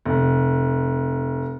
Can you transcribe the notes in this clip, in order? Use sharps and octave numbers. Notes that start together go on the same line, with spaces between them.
F1